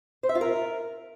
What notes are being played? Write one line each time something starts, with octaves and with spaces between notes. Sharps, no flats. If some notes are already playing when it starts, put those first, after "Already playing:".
C5
E5
F4
A#4